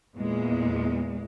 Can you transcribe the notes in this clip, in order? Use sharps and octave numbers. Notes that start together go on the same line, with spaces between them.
E2 A#2 G#3